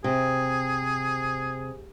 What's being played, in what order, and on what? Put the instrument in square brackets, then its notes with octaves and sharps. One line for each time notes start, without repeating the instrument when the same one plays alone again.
[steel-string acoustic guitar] C3 [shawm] G#4